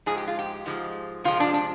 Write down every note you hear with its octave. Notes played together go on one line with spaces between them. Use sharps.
G#2 F3 G#3 G#4
G4
F4
G4
G#2 F3 G#3
C3 F3 G#3 F4
D4
D4